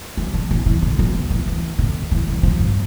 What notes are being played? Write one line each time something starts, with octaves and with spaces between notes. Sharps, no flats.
E3
F3
E3
E3
D3
F3
F3
E3
E3
D3
E3
E3
F3
G2